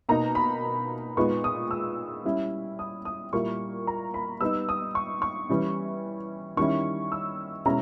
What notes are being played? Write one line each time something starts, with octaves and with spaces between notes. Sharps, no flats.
B2 A#3 D#4 A#5
B5
A#2 G#3 B3 D#4 C#6
D#6
E6
G3 C#4 E4
D#6
D#6
A#2 G3 A#3 E4 C#6
A#5
B5
G3 B3 D#4 E6
D#6
C#6
C#6
E3 G3 C#4
D#3 G3 C#4 E4 C#6
E6
B2 G#3 C#4 E4 A#5